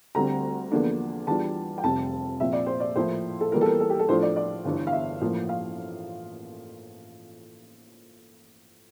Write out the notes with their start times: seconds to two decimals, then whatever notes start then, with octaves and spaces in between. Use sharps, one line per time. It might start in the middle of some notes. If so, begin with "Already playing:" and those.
0.15 D2 D3 G3 C4 A#5
0.71 E2 D3 F3 A#3 D4
1.27 E2 E3 G3 D4 F4 A5
1.78 G5
1.83 F1 F2 C3 G3 A5
2.40 A#1 A#2 F3 C4 E5
2.53 D5
2.67 C5
2.80 D5
2.96 A2 F3 A#3 E4 C5
3.41 A4
3.52 E2 E3 G3 A#3 F4 A#4
3.61 A4
3.66 A#4
3.80 A4
3.90 G4
3.99 A4
4.09 A2 F3 A3 D4 F4 C5
4.23 D5
4.36 D5
4.65 G1 G2 E3
4.87 F5
4.92 E5
5.21 A1 A2 F3 A#3
5.49 F5